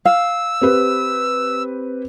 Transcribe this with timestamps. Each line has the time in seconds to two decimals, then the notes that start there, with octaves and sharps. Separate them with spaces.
0.05 F5 E6
0.61 C4 G4 B4